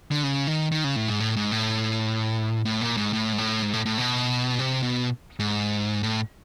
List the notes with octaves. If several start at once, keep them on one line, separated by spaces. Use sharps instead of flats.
D3
C#3
D#3
D#3
C#3
A2
G#2
A2
G#2
A2
A2
A#2
G#2
A2
G#2
A2
G#2
A2
A2
B2
C3
B2
G#2
A2